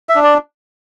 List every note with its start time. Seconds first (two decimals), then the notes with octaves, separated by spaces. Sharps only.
0.09 E5
0.15 D4
0.24 D5